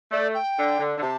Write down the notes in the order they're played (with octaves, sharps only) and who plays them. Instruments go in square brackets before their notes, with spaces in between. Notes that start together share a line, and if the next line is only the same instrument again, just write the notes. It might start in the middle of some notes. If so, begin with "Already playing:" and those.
[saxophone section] A3 [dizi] D5
[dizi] G5
[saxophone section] D3
D3
D3
[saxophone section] C3 [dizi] A5